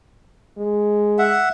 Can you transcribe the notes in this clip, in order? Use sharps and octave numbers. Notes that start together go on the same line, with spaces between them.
G#3
E5 F#5